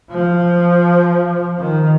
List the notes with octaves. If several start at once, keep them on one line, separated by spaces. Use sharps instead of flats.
F3
D#3